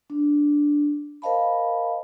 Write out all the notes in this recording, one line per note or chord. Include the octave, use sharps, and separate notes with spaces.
D4
A#4 C5 D#5 F5 A5 B5